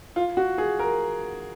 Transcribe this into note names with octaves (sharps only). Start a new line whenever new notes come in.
F4
F#4
G#4
A#4